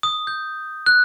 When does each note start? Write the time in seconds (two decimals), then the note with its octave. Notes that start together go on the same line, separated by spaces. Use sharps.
0.03 D#6
0.27 G6
0.86 F#6